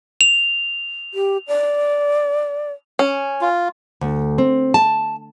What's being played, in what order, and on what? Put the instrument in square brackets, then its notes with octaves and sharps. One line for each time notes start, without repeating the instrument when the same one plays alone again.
[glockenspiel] F7
[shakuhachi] G4
D5
[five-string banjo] C#4
[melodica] F4
[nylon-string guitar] D2
C4
A5